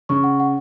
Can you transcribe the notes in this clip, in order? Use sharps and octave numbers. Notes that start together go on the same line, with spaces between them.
C#3 C#6
F#5
F#5